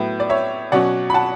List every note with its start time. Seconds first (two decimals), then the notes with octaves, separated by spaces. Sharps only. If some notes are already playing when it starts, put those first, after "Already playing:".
Already playing: A2 F#3 B3
0.20 D5
0.30 C#5 E5
0.72 B2 F#3 C#4 D5 F#5
1.10 B5
1.14 F#5 A5